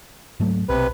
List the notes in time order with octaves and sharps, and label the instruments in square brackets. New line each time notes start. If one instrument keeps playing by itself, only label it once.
[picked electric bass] G#2 F#3 A3
[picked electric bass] B1 [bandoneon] C3 B4